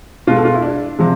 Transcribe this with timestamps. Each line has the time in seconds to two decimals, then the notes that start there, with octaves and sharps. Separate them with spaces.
0.27 B2 F4
0.31 G#3
0.37 A4
0.45 F4
0.54 E4
0.62 D4
0.99 C3 F3 G#3